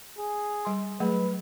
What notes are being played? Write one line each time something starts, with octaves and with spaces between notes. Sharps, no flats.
G#4
G3 C6
F#3 A3 G#4 B4